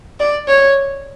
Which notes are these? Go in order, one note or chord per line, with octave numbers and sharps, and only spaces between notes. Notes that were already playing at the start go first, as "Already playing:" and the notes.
D5
C#5